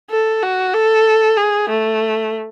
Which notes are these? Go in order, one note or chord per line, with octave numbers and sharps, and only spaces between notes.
A4
F#4
A4
G#4
A3